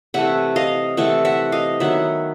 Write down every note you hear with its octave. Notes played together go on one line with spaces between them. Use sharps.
C3 E3 A3 E5 F#5
D#5 F5
C3 E3 A3 E5 F#5
E5 F#5
D#5 F5
D#3 F#3 B3 E5 F#5